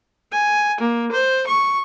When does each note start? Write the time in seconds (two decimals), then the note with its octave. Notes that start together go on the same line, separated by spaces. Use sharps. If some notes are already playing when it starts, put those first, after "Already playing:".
0.32 G#5
0.81 A#3
1.12 C5
1.47 C#6